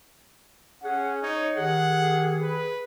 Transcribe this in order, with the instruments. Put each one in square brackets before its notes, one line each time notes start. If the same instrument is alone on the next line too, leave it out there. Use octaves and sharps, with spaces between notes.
[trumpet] C#4 [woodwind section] G#4 F#5
[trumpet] D#4 [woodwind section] C#5
[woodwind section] D#3 G4 G#4 [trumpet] F#5
[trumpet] B4